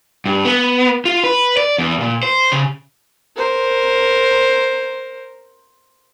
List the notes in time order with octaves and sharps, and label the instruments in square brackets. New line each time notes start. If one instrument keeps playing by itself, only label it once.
[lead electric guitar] G2
B3
F4
B4
D5
E2
A#2
C5
C#3
[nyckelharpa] A#4 C5